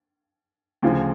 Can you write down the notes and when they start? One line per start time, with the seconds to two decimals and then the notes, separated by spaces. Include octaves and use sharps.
0.82 D2 C#3 F3